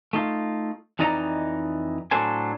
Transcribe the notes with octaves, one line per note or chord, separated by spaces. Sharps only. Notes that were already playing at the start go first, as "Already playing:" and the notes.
A3 D#4 F4
F2 E3 D#4 D5 D#5 A#5
A2 F#3 D4 A4 C5 G#5